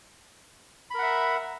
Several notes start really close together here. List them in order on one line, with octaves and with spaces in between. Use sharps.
B5 A#4 F#5 E5